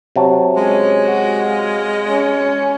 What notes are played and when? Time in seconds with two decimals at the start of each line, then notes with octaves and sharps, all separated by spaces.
0.16 C3 F#3 A5
0.57 G#3 C#4
1.04 F#4
1.48 F5
2.07 C#4